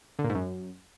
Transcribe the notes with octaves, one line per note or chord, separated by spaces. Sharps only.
D3
A#2
G#2
F#2